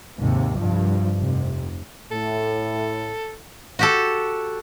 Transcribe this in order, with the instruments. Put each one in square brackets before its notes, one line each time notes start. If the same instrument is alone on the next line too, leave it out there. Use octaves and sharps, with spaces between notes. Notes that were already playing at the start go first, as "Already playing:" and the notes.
[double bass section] D#2 G#2 C3
C2 G2 F3
F1 C3
[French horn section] A2 [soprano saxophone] A4
[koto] F#4 G4 A4